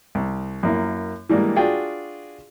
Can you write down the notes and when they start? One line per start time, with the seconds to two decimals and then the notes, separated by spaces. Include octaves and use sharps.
0.15 C2
0.63 F#2 A#3 E4
1.29 E3 G3 G#3 A#3 D4
1.56 D4 F4 F#4 G#4 D5 G5